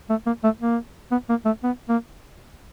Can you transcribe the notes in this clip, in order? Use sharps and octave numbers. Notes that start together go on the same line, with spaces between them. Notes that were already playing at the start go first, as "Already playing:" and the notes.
A3
A#3
A3
A#3
B3
A#3
A3
B3
A#3